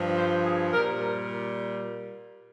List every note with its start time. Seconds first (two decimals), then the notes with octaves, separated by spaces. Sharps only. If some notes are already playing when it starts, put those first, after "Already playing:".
Already playing: G2 F3
0.16 C5
0.44 G#4
0.73 A#2 G3 A#4